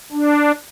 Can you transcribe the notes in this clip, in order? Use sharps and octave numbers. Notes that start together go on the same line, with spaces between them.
D4